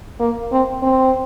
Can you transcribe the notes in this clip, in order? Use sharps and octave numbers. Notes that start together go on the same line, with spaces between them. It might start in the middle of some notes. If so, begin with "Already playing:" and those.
A#3
C4
C4